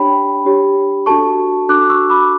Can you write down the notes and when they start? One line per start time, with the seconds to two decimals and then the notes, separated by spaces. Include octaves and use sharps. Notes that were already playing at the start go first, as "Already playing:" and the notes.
Already playing: D4 G4 C#5 G5 B5
0.45 D4 G4 C#5
1.06 D4 F#4 A4 A5 C#6
1.69 D4 F#4 A4 D6 F#6
1.89 C#6 E6
2.10 B5 D6